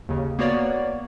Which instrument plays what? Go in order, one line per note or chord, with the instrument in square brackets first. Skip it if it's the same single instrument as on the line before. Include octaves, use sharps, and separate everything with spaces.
[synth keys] D#2 C#3
A#3 B3 F#4 C#5 D5